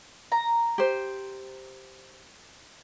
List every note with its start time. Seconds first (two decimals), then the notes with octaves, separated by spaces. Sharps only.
0.32 A#5
0.78 G4 C5